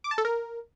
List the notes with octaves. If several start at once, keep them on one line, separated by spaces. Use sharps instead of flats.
D6
A5
A4
A#4